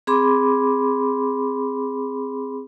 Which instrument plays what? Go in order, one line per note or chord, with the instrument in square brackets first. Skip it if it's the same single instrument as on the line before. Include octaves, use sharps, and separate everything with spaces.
[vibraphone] C4 G#4 B5 C6 D6